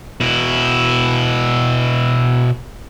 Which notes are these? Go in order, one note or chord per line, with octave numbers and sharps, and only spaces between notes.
B2 E4